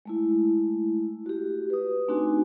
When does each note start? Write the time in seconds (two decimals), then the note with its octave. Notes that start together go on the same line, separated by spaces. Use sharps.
0.05 G#3 A3 E4
1.26 F#4 G4
1.70 B4 D#6
2.08 A3 C4 D4 D#4 F#4 G#5